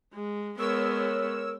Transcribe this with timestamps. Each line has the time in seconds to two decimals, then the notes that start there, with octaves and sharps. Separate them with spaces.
0.14 G#3
0.59 G#3 B3 A#4 C#5 E6